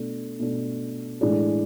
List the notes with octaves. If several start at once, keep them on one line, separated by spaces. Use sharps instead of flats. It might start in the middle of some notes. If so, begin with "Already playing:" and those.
Already playing: B2 A3 D4
B2 A3 D4
A2 E3 G#3 D4